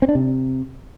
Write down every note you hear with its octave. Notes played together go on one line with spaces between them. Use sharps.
C4
D4
C3